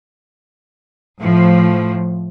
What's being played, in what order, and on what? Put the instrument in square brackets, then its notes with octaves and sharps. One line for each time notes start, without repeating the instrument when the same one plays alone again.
[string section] A2 F3